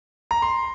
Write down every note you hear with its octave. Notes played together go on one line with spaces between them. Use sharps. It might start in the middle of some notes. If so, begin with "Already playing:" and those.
A#5
C6